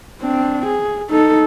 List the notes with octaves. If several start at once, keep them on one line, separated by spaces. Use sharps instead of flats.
C4 D4
G#4
D#4 A4